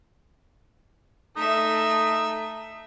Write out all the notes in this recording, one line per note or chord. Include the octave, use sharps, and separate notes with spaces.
A3 D#4 E5